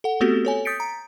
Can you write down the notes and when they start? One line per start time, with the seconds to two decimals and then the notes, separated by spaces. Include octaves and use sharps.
0.04 A4 F#5
0.20 A3 B3 C4 F#4 G4 A4
0.45 A4 C#5 G#5
0.65 D#6 G6 A6 B6 C#7 D7
0.80 A#5